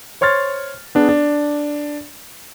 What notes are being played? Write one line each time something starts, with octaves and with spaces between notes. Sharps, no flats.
C5 C#5 C6 F6 A6
B3 D4 G#4
D4